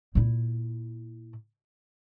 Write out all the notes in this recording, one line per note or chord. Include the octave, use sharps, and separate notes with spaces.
A#2 E4